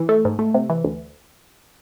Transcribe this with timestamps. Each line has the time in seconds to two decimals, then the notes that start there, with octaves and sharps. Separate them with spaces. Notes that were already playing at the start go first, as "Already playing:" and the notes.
Already playing: E3
0.09 A3
0.25 G#2
0.39 A3
0.54 C3
0.70 E3
0.84 D2